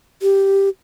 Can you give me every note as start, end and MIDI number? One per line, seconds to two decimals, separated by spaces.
0.22 0.69 67